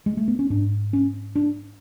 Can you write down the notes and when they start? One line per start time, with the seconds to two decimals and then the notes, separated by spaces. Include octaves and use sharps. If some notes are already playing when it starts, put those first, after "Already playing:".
0.06 G#3
0.17 A3
0.28 B3
0.39 C#4
0.50 G#2 D4
0.93 C#4
1.35 D4